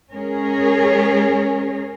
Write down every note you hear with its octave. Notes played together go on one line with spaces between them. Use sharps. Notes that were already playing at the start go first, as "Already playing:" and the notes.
G#3 C#4 G#4 A#4 C#5